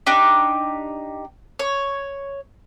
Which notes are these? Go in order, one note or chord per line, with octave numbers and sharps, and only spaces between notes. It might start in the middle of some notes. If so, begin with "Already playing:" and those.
D4 D#4 G4
C#5